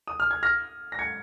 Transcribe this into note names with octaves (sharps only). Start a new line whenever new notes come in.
D#6
F6
G#6
F6 A#6
A#6
G#6 C#7